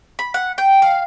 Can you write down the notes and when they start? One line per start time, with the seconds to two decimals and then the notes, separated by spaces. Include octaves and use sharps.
0.19 B5
0.34 F#5
0.58 G5
0.82 F5